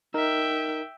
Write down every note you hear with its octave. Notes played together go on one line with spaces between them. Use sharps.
D#4 A#4 E5 G5